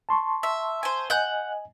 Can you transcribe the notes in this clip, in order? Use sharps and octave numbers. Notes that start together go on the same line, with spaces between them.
A5 C6 C#6
E5
C5 G#5
D#5 F#5 G#5 F#6 G6